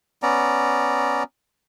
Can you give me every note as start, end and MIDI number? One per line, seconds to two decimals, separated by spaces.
0.23 1.23 59
0.23 1.23 61
0.23 1.23 74
0.23 1.23 82